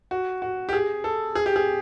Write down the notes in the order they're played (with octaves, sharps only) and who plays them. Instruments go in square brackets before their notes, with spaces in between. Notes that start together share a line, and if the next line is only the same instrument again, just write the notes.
[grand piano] F#4
F#4
G4
G#4
A4
G#4
G4
G#4